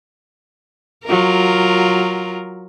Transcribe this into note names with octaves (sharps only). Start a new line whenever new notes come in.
F#3 F4 A#4